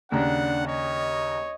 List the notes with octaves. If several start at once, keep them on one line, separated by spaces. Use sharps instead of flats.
D#2 C#3 D4 F#5 A#5
C#5 D#5